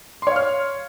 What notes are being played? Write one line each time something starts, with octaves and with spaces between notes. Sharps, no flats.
C#5 F5 C6 F6